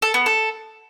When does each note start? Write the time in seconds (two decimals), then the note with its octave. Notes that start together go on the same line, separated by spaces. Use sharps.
0.02 A4
0.14 B3
0.26 A4